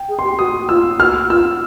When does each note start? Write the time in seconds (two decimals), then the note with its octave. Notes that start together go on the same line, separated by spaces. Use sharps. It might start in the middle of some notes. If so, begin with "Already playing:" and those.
Already playing: G5
0.09 G#4
0.19 C6
0.24 G4
0.39 F#4 D#6
0.69 F4 E6
1.00 F#4 F6
1.30 F4 E6